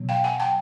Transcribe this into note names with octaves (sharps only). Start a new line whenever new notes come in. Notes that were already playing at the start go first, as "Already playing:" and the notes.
Already playing: B2 F#3
F5 G5
F#5 G#5
G5 A5